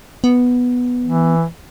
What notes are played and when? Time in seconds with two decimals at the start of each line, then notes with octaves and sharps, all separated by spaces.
0.24 B3
1.04 E3